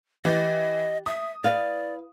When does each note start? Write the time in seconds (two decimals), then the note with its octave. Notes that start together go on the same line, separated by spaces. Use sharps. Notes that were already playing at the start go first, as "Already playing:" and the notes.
0.25 E3 G4 D#5 A6
1.06 E5 D#6
1.44 E4 B4 D5 F5